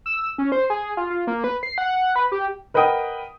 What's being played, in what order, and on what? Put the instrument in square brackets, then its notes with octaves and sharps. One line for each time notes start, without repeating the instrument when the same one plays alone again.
[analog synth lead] E6
C#4
C5
G#4
F4
F4
A#3
B4
C7
F#5
B4
G4
[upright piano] A#4 B4 D#5 F#5 G5 D#6